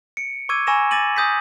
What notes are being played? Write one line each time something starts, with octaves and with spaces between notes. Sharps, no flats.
C#7 D7
C#6 D6 E6 G#6 D#7
G#5 B5 C#6 E6 A#6 E7
C#6 D6 A6 A#6 D#7 F#7
G#5 C#6 D#6 G6 A#6 B6